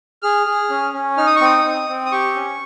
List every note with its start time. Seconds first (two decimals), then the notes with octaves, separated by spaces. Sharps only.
0.22 G#4 F6
0.46 G#4
0.70 C#4
0.94 C#4
1.17 D#4 F6
1.26 D#6
1.36 C#6
1.41 C4 D#6
1.65 C4
1.89 C4
2.06 D#6
2.12 G4 C#6
2.36 C#4